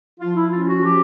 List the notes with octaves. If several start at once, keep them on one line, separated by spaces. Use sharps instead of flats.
F3 F4
E4
C#4 F4
F4
F#4
F3 G4